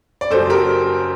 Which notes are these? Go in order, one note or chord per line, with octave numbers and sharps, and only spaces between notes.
D5
F#1 F#2 F#3 A4 C5
G4 A#4